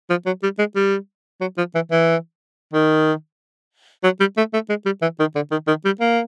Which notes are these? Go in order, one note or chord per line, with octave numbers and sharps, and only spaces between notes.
F3
F#3
G3
G#3
G3
F#3
F3
E3
E3
D#3
F#3
G3
A3
A3
G#3
G3
E3
D#3
D3
D#3
D#3
G3
A#3